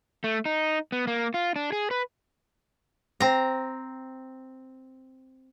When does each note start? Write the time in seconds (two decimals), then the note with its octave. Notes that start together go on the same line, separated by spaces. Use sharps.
0.24 A3
0.46 D#4
0.92 B3
1.07 A#3
1.34 F4
1.56 D4
1.72 G#4
1.91 B4
3.20 C4 A#5